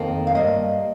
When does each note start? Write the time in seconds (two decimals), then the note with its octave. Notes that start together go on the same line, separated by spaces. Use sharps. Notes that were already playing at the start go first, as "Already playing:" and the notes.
Already playing: F2 D#3 A#3
0.27 F5
0.35 G2 G3 A#3 D#5